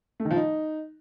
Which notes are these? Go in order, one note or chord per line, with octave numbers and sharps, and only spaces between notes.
A3
D#3
F3
D#4